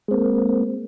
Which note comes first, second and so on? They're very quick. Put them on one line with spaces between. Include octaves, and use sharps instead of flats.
G#3 C4 A#3